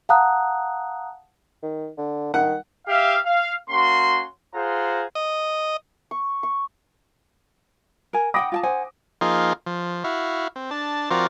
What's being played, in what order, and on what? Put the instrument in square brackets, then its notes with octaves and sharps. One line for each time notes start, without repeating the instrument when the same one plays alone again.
[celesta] F5 F#5 A5 A#5 D#6 F#6
[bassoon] D#3
D3
[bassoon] D#3 [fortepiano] F#5
[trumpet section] G4 E5 F5
F5
A#3 C#4 F#4 C6
F4 G#4 C5 F#5 A#5
[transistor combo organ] D#5
[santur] C#6
C#6
[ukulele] A#4 G#5
[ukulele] F#5 G5 B5 [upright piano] D6 D#6 A#6
[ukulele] F4 G5 A5
[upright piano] C5 [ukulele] F#5 G#5
[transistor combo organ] F3 A#3 D#4 F4 G#4
F3
E4 F#4 F5
C4
D4 A5
F3 C4 F4 F#4 A#4 D5